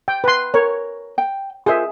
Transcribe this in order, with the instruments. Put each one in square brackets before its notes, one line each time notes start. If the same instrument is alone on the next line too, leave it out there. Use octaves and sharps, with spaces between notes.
[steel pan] G5
B4 C6
[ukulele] A#4 [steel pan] C#5
[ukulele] G5
[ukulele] F4 A#4 C5 [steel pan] G#4 E5